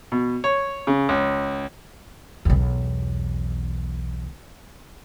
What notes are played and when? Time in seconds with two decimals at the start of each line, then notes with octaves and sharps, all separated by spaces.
0.12 B2
0.44 C#5
0.87 C#3
1.09 C#2
2.45 B1 E2